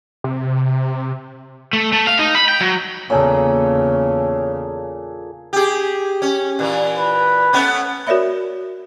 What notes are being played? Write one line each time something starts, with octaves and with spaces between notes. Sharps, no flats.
C3
A3
A3
F5
D#4
B5
G5
F#3
E2 A#2 C#3 G#4 A4 C#5
G4 G#4
C#4
A#2 E3
B4
A3 B3 C#4
F#4 A#4 C#5 D5 E5 B5